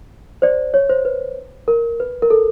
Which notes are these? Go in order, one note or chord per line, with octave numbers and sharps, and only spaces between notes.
C5 D5
C#5
C5
B4
A#4
B4
A#4
A4